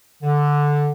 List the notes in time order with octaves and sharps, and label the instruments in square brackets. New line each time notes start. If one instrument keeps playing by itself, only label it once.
[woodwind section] D3